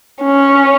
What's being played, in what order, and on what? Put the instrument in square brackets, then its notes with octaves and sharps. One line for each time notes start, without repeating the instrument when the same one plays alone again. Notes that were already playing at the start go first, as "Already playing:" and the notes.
[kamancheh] C#4